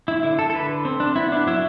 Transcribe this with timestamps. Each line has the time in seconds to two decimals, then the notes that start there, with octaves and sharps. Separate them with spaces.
0.08 E4
0.23 D3 E4
0.39 A4
0.50 A4
0.55 D3 B4
0.85 C4
1.00 D4
1.16 B3 E4
1.32 D4
1.47 F#3 E4